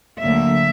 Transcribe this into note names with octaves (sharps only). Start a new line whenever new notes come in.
D2 D3 F#3 A#3 E5